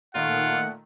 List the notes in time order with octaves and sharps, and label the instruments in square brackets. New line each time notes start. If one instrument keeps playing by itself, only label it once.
[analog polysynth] A#2 D#3 A3 [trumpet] F4 [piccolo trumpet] F#5